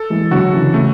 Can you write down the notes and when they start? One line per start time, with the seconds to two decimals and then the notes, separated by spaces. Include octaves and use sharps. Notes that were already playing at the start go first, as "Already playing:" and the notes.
Already playing: A4
0.10 E3 G#3
0.31 D3 F#3 F#4
0.53 C#3 E3
0.74 C#3 A3